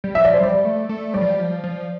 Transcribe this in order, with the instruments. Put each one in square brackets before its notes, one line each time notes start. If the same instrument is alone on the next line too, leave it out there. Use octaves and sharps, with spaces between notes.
[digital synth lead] G3
[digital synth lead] F3 [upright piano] E5
[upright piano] D5
C5
[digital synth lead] G3 [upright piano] D5
[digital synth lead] A3
A3
[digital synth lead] G3 [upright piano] D5
[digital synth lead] F3
G3
F3
F3